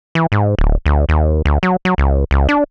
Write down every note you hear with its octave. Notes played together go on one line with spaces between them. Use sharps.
E3
G#2
D1
D2
D#2
D2
F#3
F#3
C#2
C#2
D4